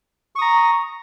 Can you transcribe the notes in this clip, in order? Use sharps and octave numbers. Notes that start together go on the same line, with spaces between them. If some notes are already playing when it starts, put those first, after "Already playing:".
A#5 C#6 D#6